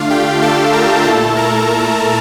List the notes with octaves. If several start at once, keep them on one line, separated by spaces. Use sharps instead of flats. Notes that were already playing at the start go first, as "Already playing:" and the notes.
Already playing: D3 A3 D4 F4 F5
G4 G5
A4 A5
A#4 A#5
A#2 A3 E4 A4 A5
A#4 A#5